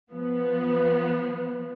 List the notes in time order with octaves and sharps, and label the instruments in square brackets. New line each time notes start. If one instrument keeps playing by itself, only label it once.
[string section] F3 B3